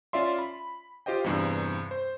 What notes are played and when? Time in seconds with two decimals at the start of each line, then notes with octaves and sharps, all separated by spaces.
0.13 C#4 F4 D5 E5 C6
0.39 B5
1.06 F4 G4 C5 D#5 G5
1.24 E2 G2 C3
1.91 C5